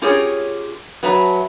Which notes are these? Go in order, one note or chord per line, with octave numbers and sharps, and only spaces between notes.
C#4 F4 G4 G#4 A#4 C#5
F#3 B4 E5 A5 A#5